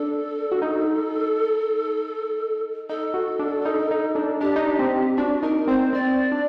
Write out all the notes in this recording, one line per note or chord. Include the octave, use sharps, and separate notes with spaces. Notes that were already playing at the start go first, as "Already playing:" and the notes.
Already playing: D4 A4
F#4
D#4
D#4 A4
F#4
D4
D#4
D#4
D4
D4 G4
D#4
D4
C4
D4 F#4
D#4 A#4
C4 C5
C4 D5
D4